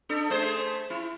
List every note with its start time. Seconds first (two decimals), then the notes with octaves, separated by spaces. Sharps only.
0.09 D4 A4
0.30 A3 G#4 C5
0.90 E4